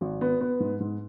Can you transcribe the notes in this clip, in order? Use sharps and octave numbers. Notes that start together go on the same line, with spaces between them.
G#1
B3
B3
G#2
G#2